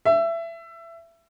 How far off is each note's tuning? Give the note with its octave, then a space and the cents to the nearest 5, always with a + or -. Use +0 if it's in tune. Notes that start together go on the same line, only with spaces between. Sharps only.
E5 +20